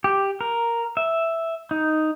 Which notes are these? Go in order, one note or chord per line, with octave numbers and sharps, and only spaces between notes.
G4
A#4
E5
D#4